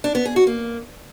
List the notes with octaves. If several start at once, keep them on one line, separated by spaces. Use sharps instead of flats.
D4
B3
G#4
F#4
A#3